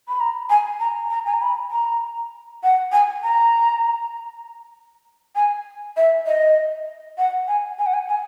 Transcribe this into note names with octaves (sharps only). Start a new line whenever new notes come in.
B5
A#5
G#5
A#5
A#5
G#5
A#5
B5
A#5
F#5
G#5
A#5
G#5
E5
D#5
F#5
G#5
G#5
F#5
G#5
G#5